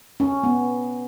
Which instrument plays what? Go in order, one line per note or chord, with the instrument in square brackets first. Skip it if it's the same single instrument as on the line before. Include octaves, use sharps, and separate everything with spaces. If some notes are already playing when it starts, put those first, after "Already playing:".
[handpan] C#4
B3